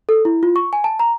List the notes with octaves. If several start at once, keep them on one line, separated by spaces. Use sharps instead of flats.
A4
E4
F4
C#6
G#5
A5
A#5